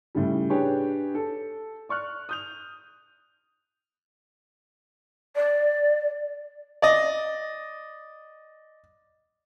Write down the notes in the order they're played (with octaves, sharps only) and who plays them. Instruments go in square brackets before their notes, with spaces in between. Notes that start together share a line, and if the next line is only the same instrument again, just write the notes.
[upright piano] A2 C#3 G3
D4 G4 G#4 B4 C#5
A4
D5 C#6 F6 F#6
D#6 G6 F7
[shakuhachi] D5
[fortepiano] D5 D#5